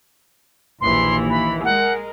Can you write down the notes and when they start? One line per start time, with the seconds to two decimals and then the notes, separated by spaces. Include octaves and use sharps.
0.81 A#1 D#2 E3 C6
1.30 B5
1.64 G#3 A#4 F#5